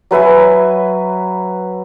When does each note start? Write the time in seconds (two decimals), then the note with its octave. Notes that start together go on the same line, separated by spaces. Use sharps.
0.11 F#3 B4 E5 G#5